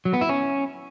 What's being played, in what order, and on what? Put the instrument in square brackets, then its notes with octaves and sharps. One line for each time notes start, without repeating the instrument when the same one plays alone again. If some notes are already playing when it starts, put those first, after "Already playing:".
[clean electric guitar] F#3
B3
E4
C#4